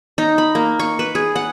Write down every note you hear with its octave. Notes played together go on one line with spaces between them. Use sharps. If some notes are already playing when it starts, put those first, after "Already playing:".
D#4
B5
A#3
C#6
B4
G#4
F#5